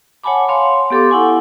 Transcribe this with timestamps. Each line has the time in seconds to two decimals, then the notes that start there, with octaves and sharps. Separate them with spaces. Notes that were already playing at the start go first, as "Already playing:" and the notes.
0.24 C#5 F#5 G#5 A5 B5 D6
0.48 C#5 F5 C6
0.90 B3 G4 A4 C6 D6
1.10 E4 F#5 G#5 C#6